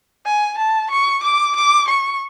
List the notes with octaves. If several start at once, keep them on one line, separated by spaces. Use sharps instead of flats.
G#5
A5
C#6
D6
D6
C#6